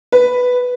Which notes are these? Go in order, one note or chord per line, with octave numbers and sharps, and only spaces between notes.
B4